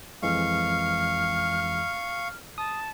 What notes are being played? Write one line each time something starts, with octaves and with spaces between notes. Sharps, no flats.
F2 E3 G#3 F5 C#6 F6
A5 D#6